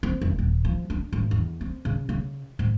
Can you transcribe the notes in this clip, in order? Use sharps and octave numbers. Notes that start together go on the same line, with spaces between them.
C4
F1
D#1
F3
D4
G#1
E2
C4
C#3
C#3
G#2